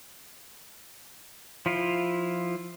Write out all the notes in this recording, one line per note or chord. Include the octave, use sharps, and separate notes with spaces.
F3 E4 F4